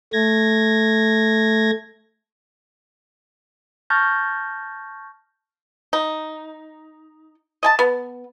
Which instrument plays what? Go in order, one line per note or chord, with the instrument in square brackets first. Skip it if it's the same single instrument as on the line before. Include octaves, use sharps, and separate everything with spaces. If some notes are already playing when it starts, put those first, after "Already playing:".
[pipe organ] A3 G#6 A#6
[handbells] A5 C#6 F6 G6 A6 A#6
[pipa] D#4
D#5 G#5 A5
B3